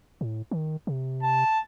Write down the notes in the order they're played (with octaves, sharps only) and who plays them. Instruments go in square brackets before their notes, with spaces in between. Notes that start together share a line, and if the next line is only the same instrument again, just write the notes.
[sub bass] A2
D#3
C3
[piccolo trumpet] A5